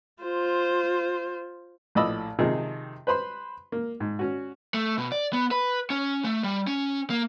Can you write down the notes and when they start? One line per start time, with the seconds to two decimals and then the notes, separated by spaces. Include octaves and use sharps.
0.23 F4 C5
1.95 A#1 A2 D5 D#5 B5 E6
2.39 C3 D#3 F3 D#4 G#4
3.07 B4 C5 B5 C6
3.72 A#3
4.00 G#2
4.19 C#4 F#4
4.74 A3
4.98 B2
5.12 D5
5.33 B3
5.51 B4
5.90 C#4
6.24 A3
6.44 G3
6.67 C#4
7.10 A#3